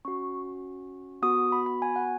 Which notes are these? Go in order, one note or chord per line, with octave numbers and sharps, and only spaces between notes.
C#4 F#4 C#6
B3 F#4 D#6
B5
B5
G#5
F#5